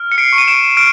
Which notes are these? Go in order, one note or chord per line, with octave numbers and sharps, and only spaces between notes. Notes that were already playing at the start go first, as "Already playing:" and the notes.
Already playing: F6
C#7
C7 D7
C#6
D#7
D7 E7
F6 D7